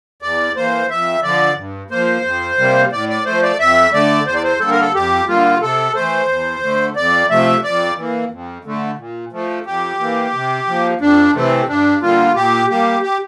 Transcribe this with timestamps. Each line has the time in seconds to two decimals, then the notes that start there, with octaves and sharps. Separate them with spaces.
0.22 E2 D5
0.56 E3 A#3 C5
0.90 F2 E5
1.23 D3 F3 D5
1.57 G2
1.90 F3 A#3 C5
2.24 F2
2.58 C3 G3 A#3
2.92 A2 D5
3.09 D5
3.25 F3 A3 C5
3.42 D5
3.60 F2 E5
3.93 D3 A3 D5
4.27 E2 C5
4.34 D5
4.43 C5
4.60 D3 G3 A#3 A4
4.70 A#4
4.80 A4
4.94 F2 G4
5.28 D3 G3 A#3 F4
5.61 C3 A4
5.95 E3 A3 C5
6.29 E2
6.63 D3 A3
6.96 F2 D5
7.30 C3 F3 A3 E5
7.64 F2 D5
7.97 E3 A#3
8.31 F2
8.65 D3 A3
8.98 A#2
9.32 F3 A3
9.66 F2 G4
10.00 E3 A#3
10.33 C3
10.68 F3 A#3
11.01 F2 D4
11.34 C3 E3 A3 C4
11.68 G2 D4
12.02 D3 G3 A#3 F4
12.35 A#2 G4
12.69 G3 A#3 G4
13.03 G4